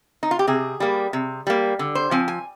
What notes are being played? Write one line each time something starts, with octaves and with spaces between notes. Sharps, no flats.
D#4
F4
G4
C3 G#4
G3 A#3
C3
G3 A#3
D3
C5
F3 C4 G#5
G#5